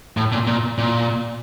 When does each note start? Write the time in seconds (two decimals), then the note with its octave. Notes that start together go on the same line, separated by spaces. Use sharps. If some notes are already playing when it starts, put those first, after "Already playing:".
0.17 A2
0.32 A#2
0.47 A#2
0.78 A#2